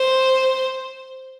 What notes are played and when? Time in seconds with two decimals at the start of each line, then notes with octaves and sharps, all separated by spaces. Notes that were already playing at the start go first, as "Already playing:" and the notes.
Already playing: C5